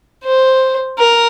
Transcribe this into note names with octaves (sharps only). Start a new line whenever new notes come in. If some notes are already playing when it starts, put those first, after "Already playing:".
C5
A#4